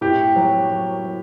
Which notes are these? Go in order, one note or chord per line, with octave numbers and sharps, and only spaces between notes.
A2 G4
F#3
F#3
F#3